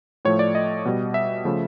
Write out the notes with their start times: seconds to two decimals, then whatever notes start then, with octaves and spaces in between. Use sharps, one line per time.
0.25 A2 F3 A3 C#5
0.39 D5
0.55 D#5
0.85 B2 G3
1.14 E5
1.45 C#3 F3 A3